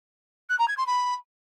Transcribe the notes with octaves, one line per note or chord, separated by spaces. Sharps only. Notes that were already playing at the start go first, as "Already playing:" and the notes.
F#6
A#5
G#6
C6
B5